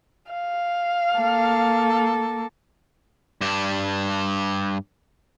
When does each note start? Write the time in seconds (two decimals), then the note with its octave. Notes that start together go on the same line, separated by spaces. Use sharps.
0.32 F5
1.16 A#3 A4
3.41 G2 D4